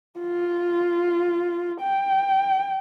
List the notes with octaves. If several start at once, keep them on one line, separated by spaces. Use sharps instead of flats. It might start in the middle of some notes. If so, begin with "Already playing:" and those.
F4
G5